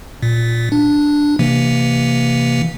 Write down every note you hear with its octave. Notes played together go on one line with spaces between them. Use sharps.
A#2
D4
C3 E3 A#3